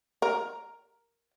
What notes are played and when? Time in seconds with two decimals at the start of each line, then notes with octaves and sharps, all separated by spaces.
0.22 A#4